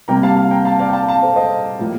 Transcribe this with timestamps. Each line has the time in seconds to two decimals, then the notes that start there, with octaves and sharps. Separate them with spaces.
0.08 C3 G3 A#3 G5 A#5
0.23 F5 A5
0.36 F5 A5
0.51 G5 A#5
0.65 F5 A5
0.79 D5 F5
0.89 G5
0.93 F5 A5
1.09 F5 A5
1.22 A4 C5
1.36 C5 D#5
1.79 A2 F3 A#3